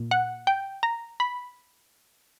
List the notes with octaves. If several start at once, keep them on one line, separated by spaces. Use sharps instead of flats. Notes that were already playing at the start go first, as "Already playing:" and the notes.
Already playing: A#2
F#5
G5
A#5
B5